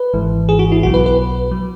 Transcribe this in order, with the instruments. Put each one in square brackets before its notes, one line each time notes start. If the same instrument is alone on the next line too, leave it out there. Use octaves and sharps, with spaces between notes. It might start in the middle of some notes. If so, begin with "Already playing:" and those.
Already playing: [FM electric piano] B4
G#1 G#2 E3
G#4
F#4
E4
B1 B2 F#3 F#4
B4
B4
F#3